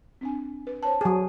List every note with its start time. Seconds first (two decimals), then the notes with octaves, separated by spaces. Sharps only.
0.21 C4 D4 G#5
0.67 B4
0.83 C5 C#5 A5
1.01 F#3 G#4